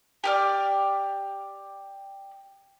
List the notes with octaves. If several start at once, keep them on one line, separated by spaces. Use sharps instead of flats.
G4 D5 F6